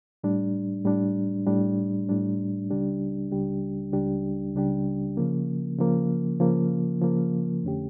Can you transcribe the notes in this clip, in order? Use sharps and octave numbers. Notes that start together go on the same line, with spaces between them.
A2 G3 D4
A2 G3 D4
A2 G3 D4
A2 G3 D4
C#2 C#3 G3 D4 G4
C#2 C#3 G3 D4 G4
C#2 C#3 G3 D4 G4
C#2 C#3 G3 D4 G4
C#3 F3 A#3
C#3 F3 A#3
C#3 F3 A#3
C#3 F3 A#3
F2 D3 A3 C#4 G4